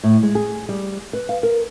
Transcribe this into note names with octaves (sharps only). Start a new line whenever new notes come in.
A2
G#3
G#4
G3
B4
F5
A#4